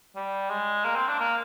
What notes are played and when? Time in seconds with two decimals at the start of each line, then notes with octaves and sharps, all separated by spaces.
0.16 G3
0.50 G#3
0.84 A#3
0.95 C4
1.08 D4
1.20 A#3